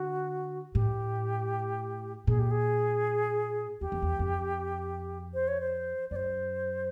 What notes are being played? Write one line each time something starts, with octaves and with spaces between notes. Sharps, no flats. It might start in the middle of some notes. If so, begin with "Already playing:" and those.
Already playing: D3 F#4
A2 G4
A#2 G#4
G4
G#4
E2 G4
F2
E2
F2
C5
C#5
C5
F#2 C5 D5